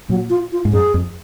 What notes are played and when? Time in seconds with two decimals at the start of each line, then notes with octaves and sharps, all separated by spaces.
0.09 A#2 F#3
0.30 F4
0.52 F4
0.65 G#2
0.73 F#2 G#4
0.94 F2